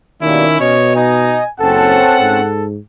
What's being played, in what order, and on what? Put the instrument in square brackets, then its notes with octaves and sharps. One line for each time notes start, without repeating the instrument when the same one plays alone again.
[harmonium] B2 G3 A#3 [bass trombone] D#3 [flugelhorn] C#4 [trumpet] E4
[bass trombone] B2 [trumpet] C#5 [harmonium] D#5
[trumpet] D#4 [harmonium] D#5 [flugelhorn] G#5
[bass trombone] F#1 [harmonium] C4 C#4 A5 [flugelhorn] A4 [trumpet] F#5
[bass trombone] G#2 [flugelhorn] A4